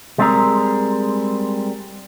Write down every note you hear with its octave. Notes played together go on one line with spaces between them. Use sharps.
G3 G#3 B3 C4 G#4 A#4